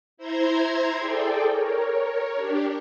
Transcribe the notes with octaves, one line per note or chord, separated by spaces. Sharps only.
E4 C5 A#5 C6 G#6
G#4 A4 D5 G5
A#4 C#5
D4 G4